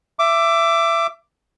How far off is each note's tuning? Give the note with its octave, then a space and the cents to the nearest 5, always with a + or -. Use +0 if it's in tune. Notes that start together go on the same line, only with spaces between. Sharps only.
E5 +20 D6 +0